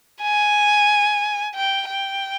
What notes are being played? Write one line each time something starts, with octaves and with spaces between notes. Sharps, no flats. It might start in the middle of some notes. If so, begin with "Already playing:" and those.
G#5
G5
G5